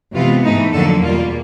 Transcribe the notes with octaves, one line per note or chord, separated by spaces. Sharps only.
C3 E3 G#3 B3 F4
G#2 E3 A3 D#4
F2 D3 F#3 A#3 A4
E2 B2 G3 A#3 F4